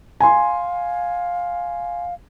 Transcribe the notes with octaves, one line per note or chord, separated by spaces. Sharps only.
F5 G#5 C6